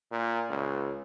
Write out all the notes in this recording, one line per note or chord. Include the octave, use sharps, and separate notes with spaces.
A#2
C#2